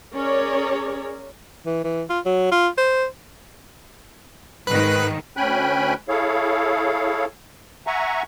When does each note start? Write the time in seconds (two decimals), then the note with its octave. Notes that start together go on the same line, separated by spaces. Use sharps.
0.13 C#4 G#4 A#4 C#5 D5
1.66 E3
1.84 E3
2.10 F4
2.26 F#3
2.52 F4
2.78 C5
4.67 G#2 D#3 B4 F#6
5.37 D2 C#4 G5 G#5 B5 F#6
6.09 E4 G#4 A4 C#5 F5
7.87 E5 F#5 G#5 A#5 C#6